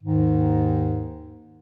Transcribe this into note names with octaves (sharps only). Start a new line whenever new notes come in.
D#2 G#2 D#3